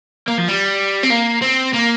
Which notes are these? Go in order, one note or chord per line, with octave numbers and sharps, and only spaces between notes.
A#3
F3
G3
C4
A#3
C4
A#3